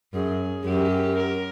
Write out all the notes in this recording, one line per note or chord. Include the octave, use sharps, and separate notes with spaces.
F#2 G#4
F#2 G4
A#4